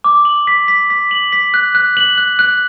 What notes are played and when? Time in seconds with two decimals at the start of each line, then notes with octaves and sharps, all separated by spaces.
0.04 D6
0.25 F#7
0.47 B6
0.68 B6
0.90 B6
1.11 F#7
1.33 B6
1.54 F#6
1.75 F#6
1.97 F#7
2.18 F#6
2.39 F#6